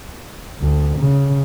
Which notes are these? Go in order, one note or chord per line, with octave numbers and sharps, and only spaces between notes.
D2
C#3